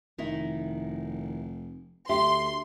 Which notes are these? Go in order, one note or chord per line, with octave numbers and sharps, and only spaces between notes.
F1 D#3 D#4 E4
D2 G4 E5 C6